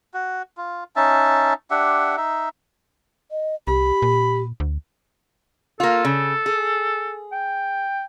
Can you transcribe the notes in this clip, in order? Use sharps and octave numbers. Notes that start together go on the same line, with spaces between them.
F#4
F4
C#4 D#4 E5 A5
D4 G4 E5 F#5
D#4 E5
D#5
C2 G4 B5
A#2
D2
A#3 F4 A4
C#3
G#4
G5